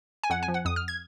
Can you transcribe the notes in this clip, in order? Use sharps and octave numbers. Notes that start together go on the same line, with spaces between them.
G#5
F2 F#5
G#5
F3
F#5
F2 D#6
F6
G#6